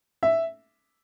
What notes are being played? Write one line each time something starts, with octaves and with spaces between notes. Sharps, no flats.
E5